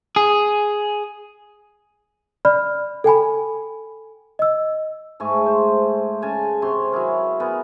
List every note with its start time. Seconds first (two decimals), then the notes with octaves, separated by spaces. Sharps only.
0.16 G#4
2.45 D5 B5 F6
3.04 A4 G5 G#5 B5
4.39 D#5 E6
5.20 G#2 A3 G#5 C#6
5.46 C5
6.22 C#3 G#5 A5
6.62 C3 C#5 C6
6.92 F#3 E4 G#4 A#4
7.40 B3 G#4 A#4